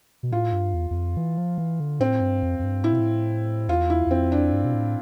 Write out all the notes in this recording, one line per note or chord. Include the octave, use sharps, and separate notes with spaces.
B2
A2 F4
G2
E2
E2
F2
E3
F3
E3
D3
A2 C4
G2
F2
F2
G2
A2 E4
B2
A2
E2 F4
E4
E2
F2 C4
D4
G2
B2
A2